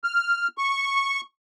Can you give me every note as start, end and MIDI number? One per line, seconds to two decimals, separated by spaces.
0.04 0.48 89
0.58 1.21 85